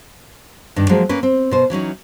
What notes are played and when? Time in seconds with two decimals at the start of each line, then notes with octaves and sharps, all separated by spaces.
0.76 G2 D#3 D4
0.89 F3 F#3 G#3 A#3
1.09 A#3 C#4 B4
1.23 C4
1.51 B2 C5
1.70 E3 F#3 C#4 D#4